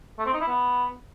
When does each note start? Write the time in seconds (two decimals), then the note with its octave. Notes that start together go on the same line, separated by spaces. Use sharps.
0.19 A3
0.26 C4
0.33 D#4
0.40 E4
0.48 B3